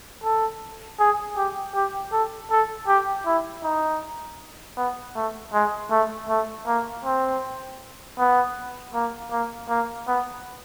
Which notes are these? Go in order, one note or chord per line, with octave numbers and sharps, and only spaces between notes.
A4
G#4
G4
G4
A4
A4
G4
E4
D#4
B3
A3
G#3
A3
A3
A#3
C4
B3
A#3
A#3
A#3
B3